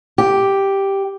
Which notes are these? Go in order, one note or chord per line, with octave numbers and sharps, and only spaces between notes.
G4